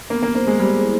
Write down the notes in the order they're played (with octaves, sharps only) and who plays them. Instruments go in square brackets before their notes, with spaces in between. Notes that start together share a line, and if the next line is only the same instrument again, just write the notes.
[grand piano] A#3 [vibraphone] B3
[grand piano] A#3
[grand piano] A#3 [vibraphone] C5
[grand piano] G#3
[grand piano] G3 [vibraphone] G#4
[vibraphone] E4